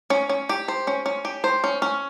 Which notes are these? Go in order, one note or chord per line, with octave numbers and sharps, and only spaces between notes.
C#4
C#4
G4
C5
C#4
C#4
G4
C5
C#4
C#4